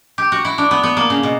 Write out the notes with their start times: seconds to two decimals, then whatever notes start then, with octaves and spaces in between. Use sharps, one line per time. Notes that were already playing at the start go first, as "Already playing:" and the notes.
0.18 G4
0.32 F#4
0.45 E4
0.58 D4
0.71 B3
0.83 B3
0.97 A#3
1.10 C#3
1.23 B2